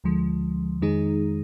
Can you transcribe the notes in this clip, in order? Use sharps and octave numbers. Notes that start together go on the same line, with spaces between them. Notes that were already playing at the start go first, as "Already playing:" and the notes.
D2 D3 F3 G#3
F2 D#3 G#3 D#4 G#4